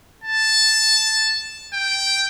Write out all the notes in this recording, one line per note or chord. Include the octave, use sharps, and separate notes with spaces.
A5
G5